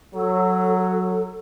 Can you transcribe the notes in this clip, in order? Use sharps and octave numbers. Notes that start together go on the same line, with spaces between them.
F#3 A4